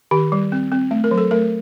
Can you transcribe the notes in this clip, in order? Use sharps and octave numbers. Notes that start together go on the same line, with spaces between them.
D#3 G4
G3
C4
C4
A3
A#4
F#3
A4
A3 A#4